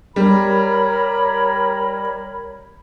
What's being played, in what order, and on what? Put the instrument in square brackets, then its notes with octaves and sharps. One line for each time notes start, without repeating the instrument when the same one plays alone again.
[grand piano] G3 [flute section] A#4 C#5 B5